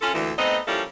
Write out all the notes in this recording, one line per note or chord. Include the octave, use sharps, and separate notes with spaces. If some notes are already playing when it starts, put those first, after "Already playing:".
C#4 F4 A4
D2 A#2 E3
A3 B3 C4 D#4 D#5
F3 G3 A#3 C#4 E4 A4